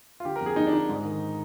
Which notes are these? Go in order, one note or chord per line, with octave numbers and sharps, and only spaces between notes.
F4
D3 G4
F2 A#4
G#4
F2 D#4
D4
D3 D#4
G#2
D#3